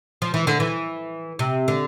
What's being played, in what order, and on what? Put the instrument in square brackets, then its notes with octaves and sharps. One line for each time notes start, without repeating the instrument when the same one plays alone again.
[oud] F3
E3
D3
E3
C3
D3